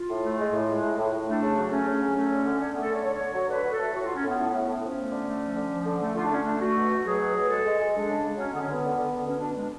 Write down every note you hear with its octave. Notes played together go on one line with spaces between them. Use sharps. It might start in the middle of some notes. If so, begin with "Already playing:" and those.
Already playing: F4
A2
A3
G#3
A2
G#3
A2
A2
A2
A3 D4
C#3
F#3
A3 C#4
C#3
F#3
A3 C#4
D3
D3
D3 C#4
A3 B3
A4
D3 C#5
D3 C#5
D3
F#3
D3 B4
F#3
A4
A3
A2 F#4
F#3 F4
C#4
A2 B3
A2
A2
A2
F3 C#4
A3
D3
A3
F3
D3
F3
D3
A3
D3 F4
D4
D3 C#4
D4
A3
A3 F#4
B2
B2
F#3 G#4
B2
B2
G#3 A4
G#3
G#3
G#3 D4
C#3
G#3
F#3 C#4
D3 B3
C#4
D3 B3
D3
D3
D3
B2 C#4
B2 D4
G#3 D4